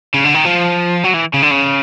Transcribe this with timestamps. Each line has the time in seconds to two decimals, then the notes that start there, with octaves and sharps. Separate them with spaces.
0.14 C#3
0.24 D3
0.34 D#3
0.45 F3
1.04 F#3
1.13 E3
1.34 C#3
1.42 D3
1.51 C#3